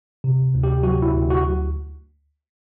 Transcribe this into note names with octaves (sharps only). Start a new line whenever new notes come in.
C3
D2
G4
F#3 F#4
E4
D2
F#4